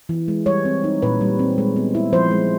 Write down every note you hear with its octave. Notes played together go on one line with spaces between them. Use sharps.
E3
G#3
G3 C#5
C4
D#4
A#2 B4
G3
C4
G#3
B3
E4
F3 C5
G#3